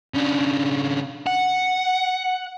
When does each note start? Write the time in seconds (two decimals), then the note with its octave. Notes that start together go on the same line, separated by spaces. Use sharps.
0.14 C#3 D4
1.27 F#5